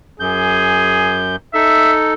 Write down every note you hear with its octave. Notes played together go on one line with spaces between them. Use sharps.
F#2 G#4 G6
D#4 A4 E5